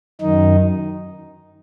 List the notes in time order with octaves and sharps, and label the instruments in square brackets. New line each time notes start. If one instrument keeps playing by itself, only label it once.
[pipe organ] F#2 D#3 D#4